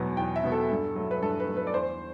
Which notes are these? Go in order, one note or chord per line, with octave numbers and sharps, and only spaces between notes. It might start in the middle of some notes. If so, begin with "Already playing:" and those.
Already playing: E2 B2 F#3 B3
E2 G5
E5
B2 F#3 B3
A4
G2
F#3 A3
B4
G2 A4
B4
F#3 A3
B4
D5
E2 C5